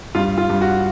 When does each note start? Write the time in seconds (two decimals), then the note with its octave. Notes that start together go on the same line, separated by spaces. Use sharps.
0.15 G2 F4
0.38 F4
0.50 G2
0.61 F#4